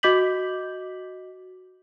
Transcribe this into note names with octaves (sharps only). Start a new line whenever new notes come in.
F#4 D#5 D6 G6 B6 F#7